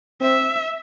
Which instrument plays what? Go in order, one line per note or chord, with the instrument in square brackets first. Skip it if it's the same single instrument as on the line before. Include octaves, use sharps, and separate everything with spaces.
[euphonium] C4 [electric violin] E5